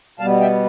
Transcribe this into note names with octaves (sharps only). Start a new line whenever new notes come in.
B2 G3 B3 F5 A5
E5 G5